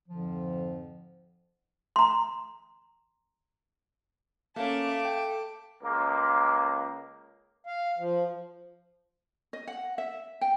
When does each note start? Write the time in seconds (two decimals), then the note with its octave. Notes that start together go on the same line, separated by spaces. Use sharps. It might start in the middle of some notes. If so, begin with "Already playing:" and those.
0.08 F2 G#2 D3 F3
1.96 A#5 C6
4.56 A3 A#3 C#4 F5 A5 D6
5.05 G5
5.83 C#2 A#3
7.67 F5
7.98 F3
9.53 D#5
9.67 F#5
9.98 E5
10.41 G5